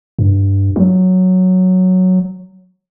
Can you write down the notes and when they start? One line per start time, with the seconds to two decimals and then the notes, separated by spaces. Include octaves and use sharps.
0.19 G2
0.76 F#3